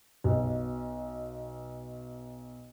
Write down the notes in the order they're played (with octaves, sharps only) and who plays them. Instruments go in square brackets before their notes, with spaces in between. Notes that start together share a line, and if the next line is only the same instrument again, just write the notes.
[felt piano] B1 B2